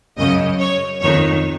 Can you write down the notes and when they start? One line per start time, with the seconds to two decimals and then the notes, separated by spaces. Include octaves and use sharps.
0.17 F#2 C#3 D#5
0.59 C#5
1.01 F2 D#3 C#5